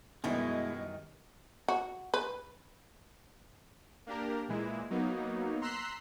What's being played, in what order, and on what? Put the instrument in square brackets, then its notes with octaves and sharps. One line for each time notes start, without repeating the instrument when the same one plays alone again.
[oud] F#2 D#3 G3 [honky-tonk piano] B2 [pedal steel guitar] G#3 E4
[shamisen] F#4
B4
[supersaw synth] A#3 D4 G4 A#4
A#2 E3 G#3 E4
F#3 A#3 B3 D#4
A#5 C6 E6 F#6 B6 C7